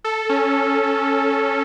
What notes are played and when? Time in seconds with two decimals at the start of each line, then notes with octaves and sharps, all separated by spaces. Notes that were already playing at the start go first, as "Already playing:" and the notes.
0.04 A4
0.29 C#4